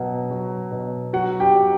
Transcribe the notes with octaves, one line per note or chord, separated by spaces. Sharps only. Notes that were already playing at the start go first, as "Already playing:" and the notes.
Already playing: B2 F#3
F#3
B2
F#3 F#4 F#5
G4 G5
F#3